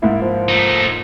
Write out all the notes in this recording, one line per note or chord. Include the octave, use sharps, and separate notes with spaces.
G#2 A#3 E4
F3
A3 D#4